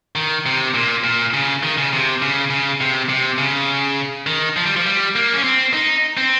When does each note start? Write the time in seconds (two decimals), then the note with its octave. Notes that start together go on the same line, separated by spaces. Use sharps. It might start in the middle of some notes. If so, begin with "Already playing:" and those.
0.15 D#3
0.46 C3
0.74 A#2
1.04 A#2
1.33 C#3
1.63 D#3
1.78 C#3
1.93 C3
2.22 C#3
2.50 C#3
2.81 C3
3.09 C3
3.38 C#3
4.27 D#3
4.56 F3
4.66 G3
4.76 F3
4.86 G3
5.16 A#3
5.34 C#4
5.44 C4
5.74 D#4
6.17 C4